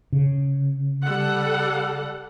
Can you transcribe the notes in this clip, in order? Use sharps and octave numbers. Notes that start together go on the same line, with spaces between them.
C#3
G3 A4 F#5